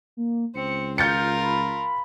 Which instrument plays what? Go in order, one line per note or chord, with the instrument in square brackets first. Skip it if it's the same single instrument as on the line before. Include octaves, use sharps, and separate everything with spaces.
[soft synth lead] A#3
[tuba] C#2 [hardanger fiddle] C4 [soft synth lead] C#7
[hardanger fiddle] F4 A#4 [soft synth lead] F6 [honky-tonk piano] G6 A6 C#7
[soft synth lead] B5